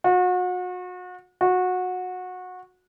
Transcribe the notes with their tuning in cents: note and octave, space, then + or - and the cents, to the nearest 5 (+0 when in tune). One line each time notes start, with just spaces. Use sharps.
F#4 -35
F#4 -20